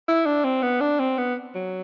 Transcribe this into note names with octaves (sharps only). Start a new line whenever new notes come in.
E4
D4
C4
B3
D4
C4
B3
F#3